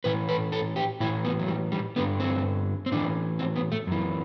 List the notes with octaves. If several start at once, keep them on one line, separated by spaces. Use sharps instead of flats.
A2 E3 B4
B4
A4
G4
A2 E3 E4
B3
F#3
G3
G3
G2 D3 B3
C4
C4
A2 E3 D4
C4
B3
A3
F#2 E3